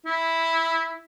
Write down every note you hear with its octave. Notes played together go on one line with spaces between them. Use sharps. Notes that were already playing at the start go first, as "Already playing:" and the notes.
E4